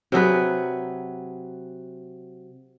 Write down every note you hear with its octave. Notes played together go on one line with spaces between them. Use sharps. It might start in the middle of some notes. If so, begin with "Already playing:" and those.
C3 F#3 G#4 B4